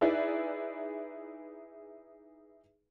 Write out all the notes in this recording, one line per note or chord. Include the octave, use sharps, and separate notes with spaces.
D#4 E4 G#4 B4 D5 E5